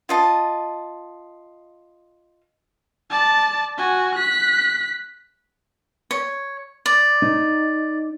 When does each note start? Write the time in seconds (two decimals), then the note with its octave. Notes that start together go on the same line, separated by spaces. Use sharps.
0.09 F4 D#5 A5
3.10 D5 A5
3.78 F#4 G#5
4.15 F#6 B6
6.11 C#5
6.86 D5
7.22 D#4